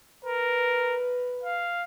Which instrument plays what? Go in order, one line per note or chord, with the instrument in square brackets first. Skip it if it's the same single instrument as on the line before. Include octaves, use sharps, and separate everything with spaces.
[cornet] A#4 [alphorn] B4
[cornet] F5